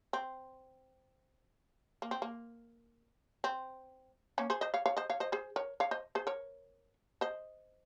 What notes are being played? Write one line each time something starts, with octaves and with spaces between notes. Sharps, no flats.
C4
A#3
C4
A#3
C4
A#3 C#4
G#4 C5
C5 D#5
C#5 F5
C#5 F5
C5 D#5
C#5 F5
C5 D#5
G#4 C5
A#4 C#5
C#5 F5
C5 D#5
G#4 C5
A#4 C#5
C5 D#5